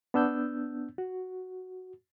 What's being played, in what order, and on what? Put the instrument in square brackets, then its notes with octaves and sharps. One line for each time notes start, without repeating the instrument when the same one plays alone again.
[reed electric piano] B3 D4 E6 G6
F#4